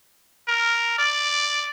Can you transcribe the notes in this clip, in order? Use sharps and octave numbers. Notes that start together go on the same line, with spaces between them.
A#4
D5